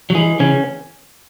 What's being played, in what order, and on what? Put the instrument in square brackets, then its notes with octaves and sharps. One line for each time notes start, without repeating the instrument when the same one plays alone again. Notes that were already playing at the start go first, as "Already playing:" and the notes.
[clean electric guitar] F#3
[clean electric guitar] E3 G#3 [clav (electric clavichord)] G#4
[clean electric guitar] C#3 E3 [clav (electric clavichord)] C#4